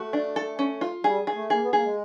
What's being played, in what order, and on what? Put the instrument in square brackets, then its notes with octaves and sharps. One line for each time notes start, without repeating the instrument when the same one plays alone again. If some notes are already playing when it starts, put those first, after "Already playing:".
Already playing: [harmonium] A3 [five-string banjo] F#4
[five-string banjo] D4
A4
C#4
F4
[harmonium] G3 [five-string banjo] G#4
[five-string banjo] G#4
[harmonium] A3
[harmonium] A#3 [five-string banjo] G#4
[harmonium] B3
[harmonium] A#3 [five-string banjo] G#4
[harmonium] G#3